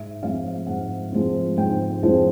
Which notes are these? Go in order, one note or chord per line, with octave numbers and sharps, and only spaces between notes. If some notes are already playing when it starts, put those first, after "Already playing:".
Already playing: G#2 E5
F3 G#3 C4 F5
G#2 F#5
F3 G#3 C4
G#2 G5
F3 G#3 C4